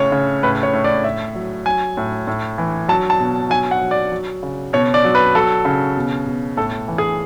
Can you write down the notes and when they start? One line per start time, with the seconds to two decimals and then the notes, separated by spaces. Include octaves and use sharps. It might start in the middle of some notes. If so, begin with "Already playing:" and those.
Already playing: A2 C#3 C#5
0.12 C#3
0.43 A2 B4
0.63 C#5
0.74 A2
0.84 D5
1.04 A2 E5
1.35 F#3
1.66 F#3 G#5
1.97 A2
2.27 A2
2.58 E3
2.88 F#3 A5
3.10 A5
3.19 B2
3.50 F#3 G#5
3.71 F#5
3.81 F#3
3.91 D5
4.12 F#3
4.43 C#3
4.73 B2 C#5
4.94 D5
5.04 F#3
5.15 B4
5.35 F#3 A4
5.65 C#3
5.97 B2
6.26 B2
6.57 A2 A4
6.88 E3
6.98 G#4